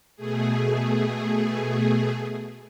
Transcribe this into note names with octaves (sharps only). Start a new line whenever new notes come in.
B2 A3 G#4